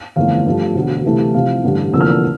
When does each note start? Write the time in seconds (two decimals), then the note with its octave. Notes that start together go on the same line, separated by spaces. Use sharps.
0.16 G1 F2 E3 A3 F5
0.46 G2 F3 A3
0.75 E1 D2 D3
1.04 C2 C3 E3 A3
1.34 C2 C3 F3 F5
1.64 A1 G2 D3
1.93 F1 E2 D3 F3 A#3 E6
2.01 F6
2.09 E6